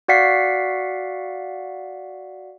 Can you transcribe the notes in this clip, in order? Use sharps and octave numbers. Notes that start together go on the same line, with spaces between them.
F#4 D5 F5 F#5 B6 C7